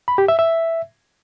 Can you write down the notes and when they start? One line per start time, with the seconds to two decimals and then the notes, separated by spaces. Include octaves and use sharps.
0.08 B5
0.18 G4
0.28 E5
0.39 E5